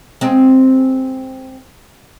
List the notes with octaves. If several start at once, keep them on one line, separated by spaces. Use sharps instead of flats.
G#3 C4